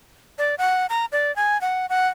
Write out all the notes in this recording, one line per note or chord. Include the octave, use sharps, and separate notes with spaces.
D5
F#5
A#5
D5
G#5
F#5
F#5